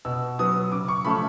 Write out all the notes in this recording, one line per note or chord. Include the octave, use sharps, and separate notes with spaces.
B2 E6
F#3 B3 D#6
C#3 D6
C#6
F3 A3 C#4 B5